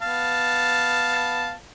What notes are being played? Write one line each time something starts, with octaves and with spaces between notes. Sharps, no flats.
B3 F5 A5